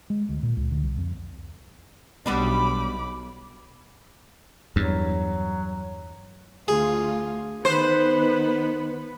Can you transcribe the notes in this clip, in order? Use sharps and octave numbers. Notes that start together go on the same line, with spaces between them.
G#3
D2
A#2
C#2
D2
C2
F2
B1 G3 B3 D4 B5 D6
E2 G2 F#3
D2 F4 G#4
D#3 B3 B4 C5